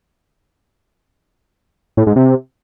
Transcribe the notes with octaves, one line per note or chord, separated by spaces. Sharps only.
A2
G#2
C3